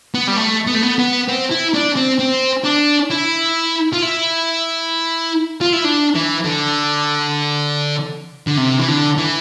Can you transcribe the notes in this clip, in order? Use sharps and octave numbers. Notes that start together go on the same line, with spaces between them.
B3
G3
A3
B3
A3
B3
B3
C4
E4
D4
C4
C4
D4
E4
F4
E4
F4
E4
D4
E3
D3
D3
C3
E3
D3
E3